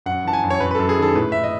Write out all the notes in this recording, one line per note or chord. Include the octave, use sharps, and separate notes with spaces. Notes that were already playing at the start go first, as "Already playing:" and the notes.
F#2 F#5
E3 A5
G#5
F#2
C#5
F#2 B4
B4
F#2 A4
G#4
D#3 A4
A2 B4
A2 E5
D#5